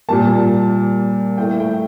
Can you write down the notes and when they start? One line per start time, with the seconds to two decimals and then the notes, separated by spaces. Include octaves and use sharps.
0.09 A#2 G3 A#3 A5
1.38 A2 A3 G5
1.60 G5